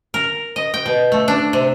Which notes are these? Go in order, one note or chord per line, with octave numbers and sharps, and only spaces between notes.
A#4
D#5
G5
B2
A3
D4
C3